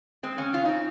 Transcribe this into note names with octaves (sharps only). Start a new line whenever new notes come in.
G#3 C4
C#3 C#4
C#3 F4
C4 D#4